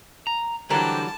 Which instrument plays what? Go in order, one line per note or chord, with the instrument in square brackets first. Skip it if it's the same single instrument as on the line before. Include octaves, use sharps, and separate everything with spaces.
[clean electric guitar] A#5
[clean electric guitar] D3 [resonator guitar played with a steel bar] E3 F#3 G3 [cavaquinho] A#4 C5 G5 [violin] A5